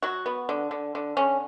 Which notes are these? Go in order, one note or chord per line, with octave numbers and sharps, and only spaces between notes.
F#3 F#4
B3
D3
D3
D3
D3 C#4